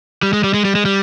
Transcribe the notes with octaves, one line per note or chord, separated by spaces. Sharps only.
G3
G#3
G3
G#3
G3
G#3
G3